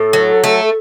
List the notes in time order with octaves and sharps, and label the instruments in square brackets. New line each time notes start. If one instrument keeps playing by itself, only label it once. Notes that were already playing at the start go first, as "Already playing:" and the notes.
Already playing: [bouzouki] A2 [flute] A4
[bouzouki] F#3
A3